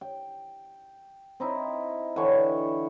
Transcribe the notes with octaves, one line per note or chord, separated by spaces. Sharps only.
G5
C4 D#4 E4
D3 E3 C#5 G5